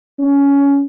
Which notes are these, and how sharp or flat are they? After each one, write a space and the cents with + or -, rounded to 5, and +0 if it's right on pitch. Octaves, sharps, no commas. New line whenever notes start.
C#4 +15